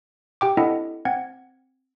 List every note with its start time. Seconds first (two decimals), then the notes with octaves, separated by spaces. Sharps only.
0.41 G4 G5 D6
0.57 C4 D4 E4 A4 D#5 F#5
1.05 C4 F#5 G#6